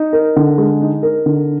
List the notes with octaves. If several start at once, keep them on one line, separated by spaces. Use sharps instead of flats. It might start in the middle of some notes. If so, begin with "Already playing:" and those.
Already playing: D#4
A#4
D3
G#3
D#4
A#4
D3